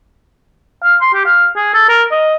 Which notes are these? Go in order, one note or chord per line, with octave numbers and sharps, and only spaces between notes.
F5
C6
G4
F5
G#4
A4
A#4
D#5